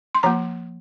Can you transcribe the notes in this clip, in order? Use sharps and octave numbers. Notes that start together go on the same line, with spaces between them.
C6
F3 A#3 A#5